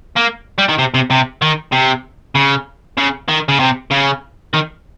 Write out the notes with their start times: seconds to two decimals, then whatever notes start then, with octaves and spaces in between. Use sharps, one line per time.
0.16 A#3
0.58 G3
0.69 D#3
0.78 C3
0.94 C3
1.10 C3
1.42 D#3
1.72 C3
2.35 C#3
2.97 C#3
3.28 D#3
3.49 C#3
3.60 C3
3.91 C#3
4.54 D#3